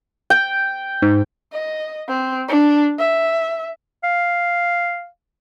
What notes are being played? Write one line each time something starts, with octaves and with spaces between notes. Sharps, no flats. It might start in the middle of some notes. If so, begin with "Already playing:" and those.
G5
G#2
D#5
C4
D4
E5
F5